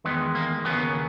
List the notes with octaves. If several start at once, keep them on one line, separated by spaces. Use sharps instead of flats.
E2 D#3 G#3 B3
A#3
D#2 C#3 F#3 B3